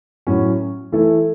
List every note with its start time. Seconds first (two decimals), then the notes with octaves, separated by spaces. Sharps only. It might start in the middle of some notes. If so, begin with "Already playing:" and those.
0.27 A2 F#3 C#4
0.92 E3 A3 E4 A4